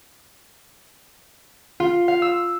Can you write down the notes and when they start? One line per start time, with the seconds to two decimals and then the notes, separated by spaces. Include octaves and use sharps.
1.80 F4
2.08 F5
2.22 E6